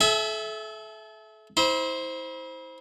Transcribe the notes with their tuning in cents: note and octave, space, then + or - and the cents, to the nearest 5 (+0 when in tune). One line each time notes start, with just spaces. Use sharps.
A4 -35 E5 +0 G#5 +0
E4 -35 C5 +0